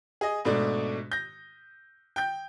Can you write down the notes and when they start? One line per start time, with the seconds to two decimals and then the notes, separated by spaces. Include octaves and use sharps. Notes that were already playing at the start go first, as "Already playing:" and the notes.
0.21 G#4 D#5
0.45 G#2 B2 A3 D4
1.12 G6 A#6
2.16 G5 G6